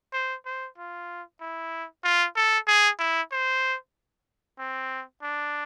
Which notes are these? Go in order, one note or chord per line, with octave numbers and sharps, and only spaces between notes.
C5
C5
F4
E4
F4
A4
G#4
E4
C5
C4
D4